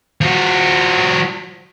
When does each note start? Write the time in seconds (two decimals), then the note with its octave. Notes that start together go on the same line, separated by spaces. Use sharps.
0.21 F3 F#4